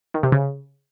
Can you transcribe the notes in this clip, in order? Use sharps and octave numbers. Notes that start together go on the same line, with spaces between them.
D#3
C3
C#3